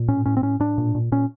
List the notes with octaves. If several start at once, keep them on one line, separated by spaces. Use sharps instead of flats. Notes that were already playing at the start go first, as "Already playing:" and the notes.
Already playing: A#2
A2 C#4
A2 C#4
C4
A2 C#4
A2 D4
A#2
A#2
A#2 C#4